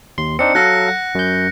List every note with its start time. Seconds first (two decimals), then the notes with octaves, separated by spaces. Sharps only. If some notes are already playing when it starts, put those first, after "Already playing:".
0.18 D#2 C6
0.39 C4 D4 D#4 C#7
0.55 F#3 A4 F5 F#6 A#6
0.88 F#5
1.15 F#2 G6